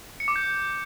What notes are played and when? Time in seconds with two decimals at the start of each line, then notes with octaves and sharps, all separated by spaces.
0.20 C#7
0.28 D6
0.36 G6